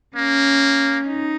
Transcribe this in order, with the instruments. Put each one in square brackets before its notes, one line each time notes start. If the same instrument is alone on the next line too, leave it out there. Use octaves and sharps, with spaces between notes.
[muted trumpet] A#3 [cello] C#4
[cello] D#4